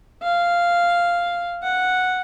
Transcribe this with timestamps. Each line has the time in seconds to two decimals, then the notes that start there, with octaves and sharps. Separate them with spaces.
0.22 F5
1.63 F#5